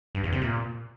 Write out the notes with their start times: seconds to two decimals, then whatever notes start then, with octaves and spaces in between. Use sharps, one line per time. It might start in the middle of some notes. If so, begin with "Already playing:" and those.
0.15 G2
0.24 E2
0.33 C3
0.41 A#2